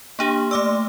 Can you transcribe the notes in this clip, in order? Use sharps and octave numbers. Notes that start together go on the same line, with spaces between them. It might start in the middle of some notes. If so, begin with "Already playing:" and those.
A#3 D4 G4 C6
A3 D5 D6 E6